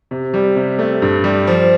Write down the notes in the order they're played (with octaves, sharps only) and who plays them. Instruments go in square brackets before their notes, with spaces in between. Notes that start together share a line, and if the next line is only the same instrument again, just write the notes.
[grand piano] C3
G3
C3
A3
G2
G3
F3